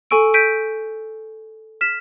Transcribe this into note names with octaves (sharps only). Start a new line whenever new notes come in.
A4 G#5 C#6 E6 D7
G6 B6 D7 D#7
F6 B6 E7